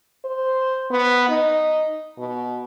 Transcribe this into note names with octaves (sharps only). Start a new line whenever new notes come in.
C5
B3
D#4
B2